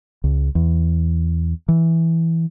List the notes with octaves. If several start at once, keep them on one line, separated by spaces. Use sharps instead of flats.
C#2
E2
E3